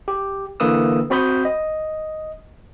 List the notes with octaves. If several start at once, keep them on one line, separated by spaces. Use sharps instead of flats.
G4
D3 E3 A#3 B4 D#6 E6
C4 F#4 C5 B5 D#6 G6
D#5